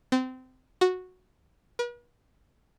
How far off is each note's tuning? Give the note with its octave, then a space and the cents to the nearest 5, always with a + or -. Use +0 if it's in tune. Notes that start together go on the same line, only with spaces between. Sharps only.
C4 -25
F#4 -10
B4 -45